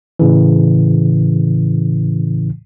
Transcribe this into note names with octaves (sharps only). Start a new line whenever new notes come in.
A2 C#3 E3